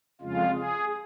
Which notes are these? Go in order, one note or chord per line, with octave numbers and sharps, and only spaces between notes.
F2 C#3 G#3 F4
G#4